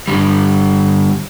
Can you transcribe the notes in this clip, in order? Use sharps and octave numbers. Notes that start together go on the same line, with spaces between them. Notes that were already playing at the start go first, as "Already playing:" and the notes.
G2 D3 G3